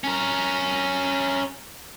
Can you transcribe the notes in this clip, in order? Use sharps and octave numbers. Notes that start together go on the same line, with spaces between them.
C#4 A#4